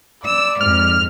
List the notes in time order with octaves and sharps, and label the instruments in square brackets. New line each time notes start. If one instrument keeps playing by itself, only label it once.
[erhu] D5 [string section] E6
[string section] F2 G#2 [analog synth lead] F6